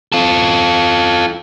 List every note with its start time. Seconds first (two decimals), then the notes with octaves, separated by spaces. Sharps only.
0.12 F4 A4